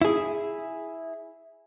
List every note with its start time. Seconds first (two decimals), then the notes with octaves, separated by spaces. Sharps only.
0.02 E4 G#4